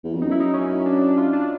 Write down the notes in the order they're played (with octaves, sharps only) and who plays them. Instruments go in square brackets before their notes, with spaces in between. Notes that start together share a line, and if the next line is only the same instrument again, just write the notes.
[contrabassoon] E2
F2
[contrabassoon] F#2 [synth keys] D#4
[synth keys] E4
D#4
C#4
C#4
D4
D4
F4
D4